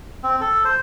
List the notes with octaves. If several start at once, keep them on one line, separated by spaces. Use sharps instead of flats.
C4
A4
C5